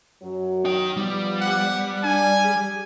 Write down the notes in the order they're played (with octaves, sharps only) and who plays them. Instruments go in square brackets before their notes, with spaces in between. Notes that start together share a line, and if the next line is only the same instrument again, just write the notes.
[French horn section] F#2 F#3
[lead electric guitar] D#4 G5
[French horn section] F3 B3 [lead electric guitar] G3
[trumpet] F#5
[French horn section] D4 [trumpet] G#5
[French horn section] G4 G#4